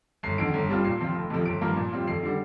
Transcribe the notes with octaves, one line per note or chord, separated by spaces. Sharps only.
G1 C7
F2 D3 D7
G1
G2 G3 C4 F4
A#2 C7
F3 C4 F4
F1
F2 C3 F3
G1 D7
G2 F3 A#3 F4
A#2
G3 C4 F4
F2 C7
D3 G3